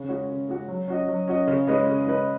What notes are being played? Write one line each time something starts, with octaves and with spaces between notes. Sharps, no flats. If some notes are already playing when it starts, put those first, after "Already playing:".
Already playing: C#3
G#3 C#4 F#4
C#3
G#3 C#4 F#4
F#3
C#4 F#4 D#5
F#3
C#4 F#4 D#5
C#3
G#3 C#4 B4 D#5
C#3
G#3 C#4 B4 D#5